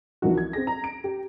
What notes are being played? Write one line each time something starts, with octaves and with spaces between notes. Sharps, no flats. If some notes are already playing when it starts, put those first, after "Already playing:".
C2 E3 F3 D#4 F#4
G#6
C4 G#4 A#6
A#5
D7
G4